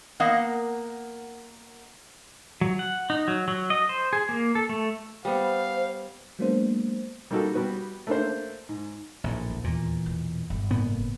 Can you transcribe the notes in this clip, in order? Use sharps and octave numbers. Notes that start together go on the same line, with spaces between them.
A#3 B3 A#4 D#5 F5 F#5
F#3
F#5
D#4
F#3
F#3
D#5
C5
G#4
A#3
A4
A3
G3 B3 C5 F5
F#3 G#3 A#3 B3 D4 C5
G3 A#3 D#4 F#4 A4
G3 B3 F#4
A3 A#3 D4 C5
G#2
A#1 A2
D#2
E2 A#2 E3
B2
G1
A2 C#3 A#3 B3